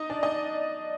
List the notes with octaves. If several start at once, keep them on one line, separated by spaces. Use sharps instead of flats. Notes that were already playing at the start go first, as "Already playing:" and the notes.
Already playing: D#4 D#5
D4 D5
D#4 D#5